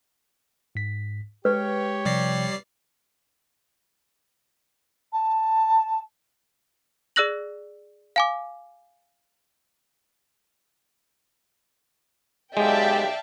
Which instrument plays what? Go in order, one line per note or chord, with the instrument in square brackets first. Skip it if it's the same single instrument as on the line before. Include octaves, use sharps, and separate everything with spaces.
[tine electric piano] G#2 B6
[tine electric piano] G#3 [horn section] G4 C#5 [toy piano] B4
[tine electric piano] C3 F3 A#6 [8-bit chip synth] G3 D5 C7
[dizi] A5
[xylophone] G#4 D5 E6 F#6 A#6 F#7
F5 G#5 D6
[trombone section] B1 G4 [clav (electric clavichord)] G#3 [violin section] D5 G5 [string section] E5 F5 A5